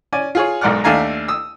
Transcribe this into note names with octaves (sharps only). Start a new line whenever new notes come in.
C#4 D5 G#5
F4 G#4 C#5
B1 G#2 A#4 D5 F#5 F6
D#2 A3 D4 F5 G#5 A#5
D#6 E6